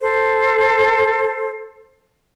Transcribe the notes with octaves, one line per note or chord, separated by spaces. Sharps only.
A4 C5